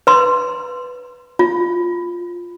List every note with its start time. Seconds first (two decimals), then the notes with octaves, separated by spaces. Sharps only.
0.07 B4 C6
1.39 F4